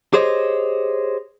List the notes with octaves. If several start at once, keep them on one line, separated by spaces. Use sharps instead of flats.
G4 G#4 C5 C#5 D#5